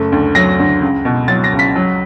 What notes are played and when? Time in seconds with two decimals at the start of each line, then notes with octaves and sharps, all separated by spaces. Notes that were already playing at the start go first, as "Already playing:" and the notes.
Already playing: F#1 A3
0.12 D2
0.35 F#3 A#6
0.59 D2
0.82 C#2
1.05 B2
1.28 F#3 A6
1.44 A#6
1.52 C#2
1.59 B6
1.76 F#3